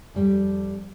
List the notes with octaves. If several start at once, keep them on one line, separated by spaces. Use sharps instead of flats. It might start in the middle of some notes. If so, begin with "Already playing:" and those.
F2 G3